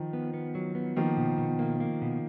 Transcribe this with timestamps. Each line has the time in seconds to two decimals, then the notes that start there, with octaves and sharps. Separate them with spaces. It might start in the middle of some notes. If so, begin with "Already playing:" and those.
Already playing: D#3 F3
0.13 B3
0.33 B3
0.55 F#3
0.75 B3
0.96 D#3 F3 A#3
1.17 B2
1.38 B2
1.59 A#3
1.80 A#3
2.02 B2